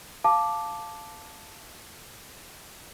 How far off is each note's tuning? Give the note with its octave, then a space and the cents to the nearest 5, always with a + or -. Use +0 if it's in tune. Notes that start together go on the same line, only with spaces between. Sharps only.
F5 +0 A5 +0 D6 +0